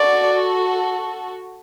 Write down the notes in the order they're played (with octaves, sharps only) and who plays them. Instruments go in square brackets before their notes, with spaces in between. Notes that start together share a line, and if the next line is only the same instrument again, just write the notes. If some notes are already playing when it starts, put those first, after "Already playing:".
Already playing: [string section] F#4 A4 [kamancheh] D5